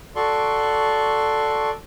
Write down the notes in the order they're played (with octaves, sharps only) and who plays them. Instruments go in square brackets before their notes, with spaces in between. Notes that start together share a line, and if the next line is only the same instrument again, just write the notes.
[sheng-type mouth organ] F#4 A4 D5 C6 C#6